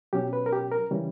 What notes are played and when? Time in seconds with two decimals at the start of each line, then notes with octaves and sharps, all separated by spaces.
0.13 B2 F#3 C#4 G4
0.33 B4
0.46 A#4
0.53 G4
0.72 A#4
0.91 C#3 E3 G3 C#4